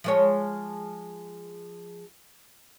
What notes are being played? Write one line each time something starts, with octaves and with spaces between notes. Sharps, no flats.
F3 G#3 C#5